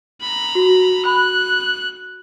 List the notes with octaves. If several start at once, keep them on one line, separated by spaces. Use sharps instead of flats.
A#5 B5
F#4
B5 F#6